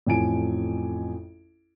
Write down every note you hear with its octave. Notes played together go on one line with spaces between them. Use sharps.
A1 F2 G#5 D7